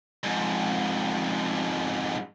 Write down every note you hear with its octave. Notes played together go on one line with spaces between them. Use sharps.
F2 G#2